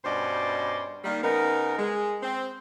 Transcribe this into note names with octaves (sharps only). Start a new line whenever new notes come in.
G2 B2 C#4 C5 D5 D#5
D#3 G3 A#3
C#3 B3 D#4 A#4
G#3
C4